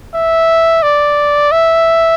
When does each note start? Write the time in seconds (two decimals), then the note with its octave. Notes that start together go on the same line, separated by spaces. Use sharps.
0.15 E5
0.82 D5
1.52 E5